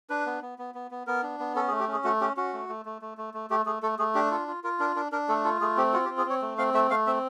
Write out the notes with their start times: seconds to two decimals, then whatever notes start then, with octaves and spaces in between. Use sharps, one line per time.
0.10 D4 B4
0.26 B3
0.42 B3
0.58 B3
0.75 B3
0.91 B3
1.07 B3 A#4
1.23 D4
1.40 B3
1.56 C#4 A4
1.68 G#4
1.72 A3
1.80 G4
1.88 C#4 G#4
2.04 A3 F#4
2.21 C#4 G4
2.37 C#4 F#4
2.53 A3
2.69 A3
2.85 A3
3.02 A3
3.18 A3
3.34 A3
3.50 A3 G4
3.66 A3 G#4
3.83 A3 A4
3.99 A3 G#4
4.15 D4 G4
4.31 F4 A4
4.48 F4
4.64 F4 A#4
4.80 D4 A#4
4.96 D4 A#4
5.12 D4 A#4
5.28 A3 A4
5.44 F4 A4
5.61 A3 G#4
5.77 C4 G4
5.93 F4 F#4
6.05 G4
6.09 C4
6.18 G#4
6.26 C4 C#5
6.42 A3
6.58 C4 F5
6.74 A3 E5
6.90 A3 F5
7.06 C4 E5